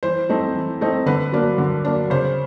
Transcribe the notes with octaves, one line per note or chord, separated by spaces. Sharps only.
E3 C5
A3 C4 D#4
E3
A3 C4 D#4
D3 B4
F#3 A#3 D4
D3
F#3 A#3 D4
C#3 C5